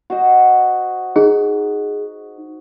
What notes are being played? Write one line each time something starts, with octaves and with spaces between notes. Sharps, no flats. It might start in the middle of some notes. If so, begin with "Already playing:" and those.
F#4 C5 D#5
D#4 G#4